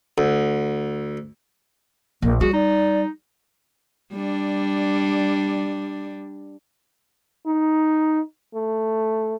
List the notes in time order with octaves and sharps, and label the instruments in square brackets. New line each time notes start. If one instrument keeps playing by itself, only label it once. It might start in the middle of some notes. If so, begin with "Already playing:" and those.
[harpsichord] D2
[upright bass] A#1 [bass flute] A#3
[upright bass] G3 [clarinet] F#4 [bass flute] G#4
[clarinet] D#4 [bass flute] D5
[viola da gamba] G3 D4
[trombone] D#4
A3